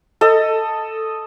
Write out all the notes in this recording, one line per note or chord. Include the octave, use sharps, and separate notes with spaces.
A4 D#5